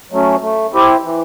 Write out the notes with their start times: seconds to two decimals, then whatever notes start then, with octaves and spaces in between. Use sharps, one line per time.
0.12 F#3 A3 C#4
0.42 A3
0.73 C4 E4 G4
1.03 E3